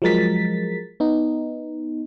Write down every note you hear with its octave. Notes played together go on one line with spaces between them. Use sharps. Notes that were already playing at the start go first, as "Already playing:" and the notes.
F3 F#3 G#3 A#4 A6 B6
B3 D#4